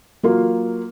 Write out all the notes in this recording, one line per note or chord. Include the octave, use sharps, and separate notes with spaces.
F#3 A#3 F4